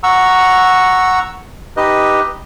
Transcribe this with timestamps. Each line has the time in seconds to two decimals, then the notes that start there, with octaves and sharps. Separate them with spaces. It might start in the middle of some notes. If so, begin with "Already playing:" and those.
0.03 F#5 A#5 C#6 E6
1.77 D#4 G4 B4 D#5